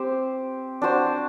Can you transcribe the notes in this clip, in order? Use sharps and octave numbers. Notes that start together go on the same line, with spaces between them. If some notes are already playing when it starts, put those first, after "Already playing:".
Already playing: C4 G4 C5
D4 F#4 C5